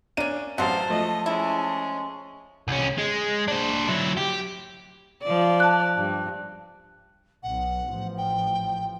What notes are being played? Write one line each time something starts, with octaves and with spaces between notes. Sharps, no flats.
A#3 C#4 D4 D#7
A1 F#3 G#3 C5 F5 F#5 A5
F3 A3 D#5
G#3 C#4 E4
C2 C#4
G#3
D4 C5
F#3 E4
G4
F3 D5
A5 F#6
G2
B1 F#5
A1 F3
G5